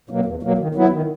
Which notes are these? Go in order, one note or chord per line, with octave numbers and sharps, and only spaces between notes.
B2 F#3 A#3
E2
B2 F#3 A#3
D#3
F#3 B3 E4
D#3